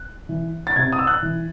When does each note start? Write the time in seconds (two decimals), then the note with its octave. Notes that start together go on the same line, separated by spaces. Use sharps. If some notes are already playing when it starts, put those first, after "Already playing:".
Already playing: F#6
0.29 E3
0.67 A6
0.76 C3 G#6
0.92 D#6
0.99 E6
1.07 F#6
1.22 E3